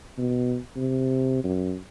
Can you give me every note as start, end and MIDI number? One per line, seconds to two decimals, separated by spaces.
0.18 0.57 47
0.76 1.40 48
1.44 1.76 42